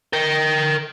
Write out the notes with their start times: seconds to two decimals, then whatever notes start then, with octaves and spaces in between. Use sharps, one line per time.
0.13 A#4 G5